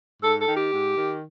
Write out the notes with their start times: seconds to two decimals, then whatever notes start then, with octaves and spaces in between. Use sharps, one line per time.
0.22 G#2 A4
0.39 A4
0.47 D#3
0.56 G4
0.72 G#2
0.97 D#3